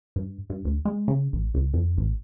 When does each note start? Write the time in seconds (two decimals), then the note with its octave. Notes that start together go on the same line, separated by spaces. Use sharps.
0.16 G2
0.50 G2
0.65 D2
0.85 G#3
1.08 C#3
1.33 A1
1.54 C#2
1.74 F2
1.97 A1